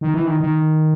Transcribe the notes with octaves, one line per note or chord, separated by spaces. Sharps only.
D#3
E3
D#3
D#3